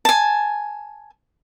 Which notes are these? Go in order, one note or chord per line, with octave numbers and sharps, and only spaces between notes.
G#5 A5